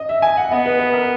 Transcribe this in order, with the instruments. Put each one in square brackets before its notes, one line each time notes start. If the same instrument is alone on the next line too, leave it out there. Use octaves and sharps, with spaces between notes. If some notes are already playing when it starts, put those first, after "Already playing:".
Already playing: [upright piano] D#5
E5
G#5
F#5
[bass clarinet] B3 [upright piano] D#5
[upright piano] B4
B4
A#4